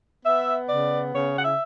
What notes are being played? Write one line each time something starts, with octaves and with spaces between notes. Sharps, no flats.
B3 E5
C#3 D5
C#3 C#5
F#5
E5